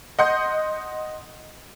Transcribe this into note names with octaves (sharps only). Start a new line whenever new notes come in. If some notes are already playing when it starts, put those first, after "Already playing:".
D#5 F#5 C6 G6